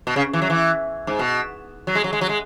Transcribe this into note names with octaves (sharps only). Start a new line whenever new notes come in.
B2
C#3
E3
F#3
E3
G#2
B2
F#3
G#3
F#3
G#3
F#3
G#3